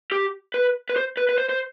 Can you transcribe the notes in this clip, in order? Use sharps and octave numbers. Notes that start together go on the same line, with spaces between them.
G4
B4
B4
C5
B4
B4
C5
C5